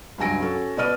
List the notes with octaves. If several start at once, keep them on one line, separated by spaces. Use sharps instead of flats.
C#2 G2 F#3 G#5 A#6 D7
C#4 F#4 A4
B2 B3 D5 D#5 F6 D#7